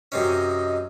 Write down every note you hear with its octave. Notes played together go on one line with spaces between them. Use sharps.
F#2 C3 C#4 D#5